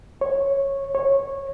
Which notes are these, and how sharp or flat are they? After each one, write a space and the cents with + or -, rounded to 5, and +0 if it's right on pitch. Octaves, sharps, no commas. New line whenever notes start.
C#5 -10
C#5 -15